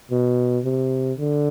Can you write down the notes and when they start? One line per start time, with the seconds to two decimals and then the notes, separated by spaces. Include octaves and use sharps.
0.11 B2
0.65 C3
1.18 D3